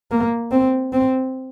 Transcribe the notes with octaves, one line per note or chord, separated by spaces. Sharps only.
A#3
C4
C4